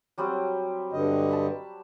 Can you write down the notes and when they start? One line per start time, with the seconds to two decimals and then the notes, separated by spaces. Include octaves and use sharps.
0.18 F#3 G3 C4
0.93 G2 D3 D#5
1.31 A5 B5